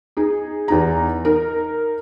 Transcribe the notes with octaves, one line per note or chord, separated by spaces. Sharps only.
D#4 G#4
E2 D#4 A#5
D#4 A#4